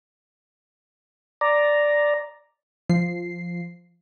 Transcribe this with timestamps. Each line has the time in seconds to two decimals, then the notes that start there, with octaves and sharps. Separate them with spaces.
1.41 D5 A#5
2.89 F3 C7